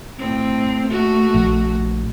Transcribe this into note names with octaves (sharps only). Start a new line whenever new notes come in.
A2 C4
A3 A#3 F#4
A#1